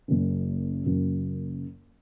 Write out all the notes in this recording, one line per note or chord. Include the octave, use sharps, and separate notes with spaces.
F#1 F#2 F#3 A#3 C#4
F#1 F#2 F#3 A#3 C#4